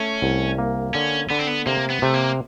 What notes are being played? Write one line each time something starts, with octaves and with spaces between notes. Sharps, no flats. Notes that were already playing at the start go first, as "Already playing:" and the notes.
Already playing: A3 C#4
C2
A#3
D3 C#4
D3 B3
C4
B3
C3 A#3
B3
C3 A3
A#3